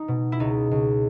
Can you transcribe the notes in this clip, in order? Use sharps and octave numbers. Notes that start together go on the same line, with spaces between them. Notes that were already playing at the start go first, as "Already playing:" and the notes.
Already playing: D#4
B2
E4
C#2 D#4
C#2